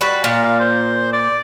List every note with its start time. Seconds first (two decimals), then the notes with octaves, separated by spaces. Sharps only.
0.01 G3 F#4 B4
0.24 A#2 F5
0.44 F5
0.60 C5
1.13 D5